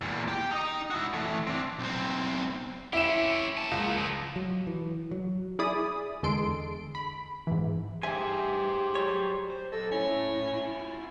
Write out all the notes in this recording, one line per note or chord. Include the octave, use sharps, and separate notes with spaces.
E2 A#2
G4 G5
D#4 D#5
E4 F#4
E3 A3
C4 D4
B1 C4
C#4 E4 G4 E7
A#3 A5
C#2
G2 F3
F#3
E3
F#3
E4 G#4 D5 B5 D#6
E2 D3 G#3 A4 C6 D7
B5
G#2 E3
G2 G4 G#4 C5 E5 G#5
F#3 G3 C#5
C5
F#3 A4 D#5
A2 C#4 E4
E4 F4